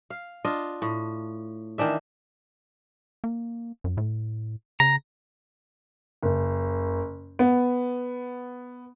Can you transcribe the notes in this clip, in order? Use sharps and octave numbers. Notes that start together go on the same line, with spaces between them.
F5
D4 F4 D#5
A2
D#3 E3 D4 E5
A#3
F#2
A2
C#3 A#5
F#1
B3